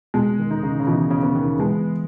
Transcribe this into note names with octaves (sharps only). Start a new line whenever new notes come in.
B2 G#3
D#3
D#4
C#3
C#3
B2 E3
C#3
B3
D#3
E3 G#3